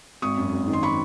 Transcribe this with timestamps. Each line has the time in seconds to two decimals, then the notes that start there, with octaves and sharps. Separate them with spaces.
0.22 G#1 C#6 D#6
0.38 F#2
0.53 G#1
0.68 D#3
0.73 C6
0.83 B5 C#6